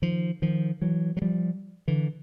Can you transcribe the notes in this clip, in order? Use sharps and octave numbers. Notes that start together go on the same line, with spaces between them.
D#3 F3
D#3 F3
E3 F#3
F#3
F3 G3
D3 E3